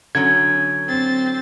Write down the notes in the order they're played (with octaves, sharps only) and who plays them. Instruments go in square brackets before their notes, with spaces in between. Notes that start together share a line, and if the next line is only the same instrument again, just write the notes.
[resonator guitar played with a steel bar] D3 F#3 C#4 [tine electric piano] G#6
[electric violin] C4 A6